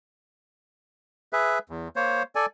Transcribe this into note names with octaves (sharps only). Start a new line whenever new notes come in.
G#4 B4 E5
E2
A#3 C5 C#5
A4 D5 G#5